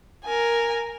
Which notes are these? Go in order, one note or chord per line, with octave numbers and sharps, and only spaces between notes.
A#4 G#5